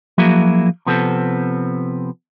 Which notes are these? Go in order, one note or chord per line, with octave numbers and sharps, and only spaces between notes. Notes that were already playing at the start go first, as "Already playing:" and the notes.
F3 F#3 A#3 E4 F#4 G#4
C3 F3 B3 C4 A4